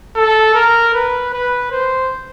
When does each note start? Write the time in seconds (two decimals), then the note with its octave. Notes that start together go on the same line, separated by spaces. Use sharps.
0.16 A4
0.55 A#4
0.94 B4
1.34 B4
1.72 C5